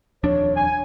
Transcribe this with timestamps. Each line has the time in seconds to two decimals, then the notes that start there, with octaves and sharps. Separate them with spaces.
0.23 D#1 F2 D4 C#5
0.56 G#5